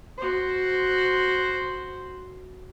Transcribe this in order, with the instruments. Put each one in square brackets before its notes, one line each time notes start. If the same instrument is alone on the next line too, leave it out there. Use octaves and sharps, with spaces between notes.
[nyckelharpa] F#4 C5